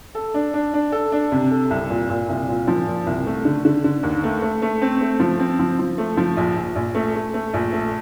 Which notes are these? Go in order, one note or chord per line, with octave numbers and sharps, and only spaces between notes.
A4
D4
D4
D4
A4
D4
C3
A4
C2
A#2
A#2
C2
A#2
F3
A#2
C2
A3
D3
D3
D3
D#2
A3
A3
A3
C4
A3
F3
C4
F3
F3
A3
F3
A#1
A#1
A#1
A3
A3
A3
A#1
A3